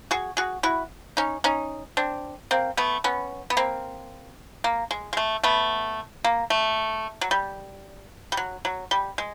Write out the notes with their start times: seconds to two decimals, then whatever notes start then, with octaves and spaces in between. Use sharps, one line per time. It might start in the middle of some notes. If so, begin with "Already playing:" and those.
0.11 F#4 G#4
0.37 F#4 G#4
0.63 E4 F#4
1.17 C#4 D#4
1.44 C#4 D#4
1.97 C4 D4
2.51 A#3 C4
2.77 A3 B3
3.04 B3 C#4
3.50 B3
3.57 A#3 C4
4.64 A#3
4.91 G#3
5.13 G#3
5.17 A3
5.43 A3 B3
6.24 A#3
6.50 A3
7.21 F#3
7.31 G3
8.32 G3
8.37 F#3
8.65 F#3
8.91 G3
9.18 G#3